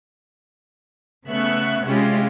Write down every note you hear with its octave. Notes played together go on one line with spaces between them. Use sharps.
C#3 A3 B3 E5 C#6 F#6
C3 G#3 C#4 E4 F4 G4